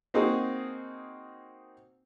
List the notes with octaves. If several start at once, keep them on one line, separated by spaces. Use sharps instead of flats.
A#3 C4 D#4 F#4 G#4